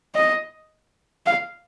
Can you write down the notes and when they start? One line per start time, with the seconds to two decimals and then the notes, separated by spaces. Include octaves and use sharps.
0.15 D#5
1.26 F5